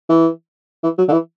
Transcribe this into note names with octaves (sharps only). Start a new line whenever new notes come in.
E3
E3
F#3
D3
E3